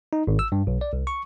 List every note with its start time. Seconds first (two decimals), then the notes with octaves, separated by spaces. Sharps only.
0.13 D#4
0.27 G#1
0.39 E6
0.52 G2
0.67 B1
0.81 D5
0.93 C2
1.07 C#6